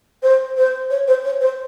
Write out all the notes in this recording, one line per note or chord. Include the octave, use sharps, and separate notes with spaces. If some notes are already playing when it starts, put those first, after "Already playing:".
C5
C5
C#5
C5
C#5
C5